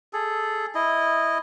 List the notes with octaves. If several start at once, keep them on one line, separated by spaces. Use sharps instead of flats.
G#4 A4
E4 D#5